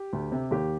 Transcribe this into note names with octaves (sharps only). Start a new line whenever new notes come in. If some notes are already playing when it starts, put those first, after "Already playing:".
Already playing: G4
D2
C3
D#2 G4